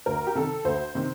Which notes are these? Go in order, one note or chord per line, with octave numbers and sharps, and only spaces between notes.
D2 A#4
G4
C3 D#3 A4
D2 C5
C3 D#3